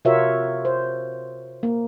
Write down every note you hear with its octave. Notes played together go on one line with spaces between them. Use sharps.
C3 F4 F#4 A#4 C#5 E5
C5
A#3